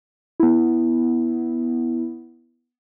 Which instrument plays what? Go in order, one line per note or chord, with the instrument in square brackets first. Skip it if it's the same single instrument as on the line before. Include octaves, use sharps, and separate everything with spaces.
[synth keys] B3 E4